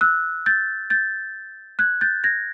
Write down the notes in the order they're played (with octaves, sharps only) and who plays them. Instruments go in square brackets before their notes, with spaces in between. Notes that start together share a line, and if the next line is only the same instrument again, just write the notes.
[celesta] E6 F#6
G6 A6
G6 A6
F#6 G#6
G6 A6
G#6 A#6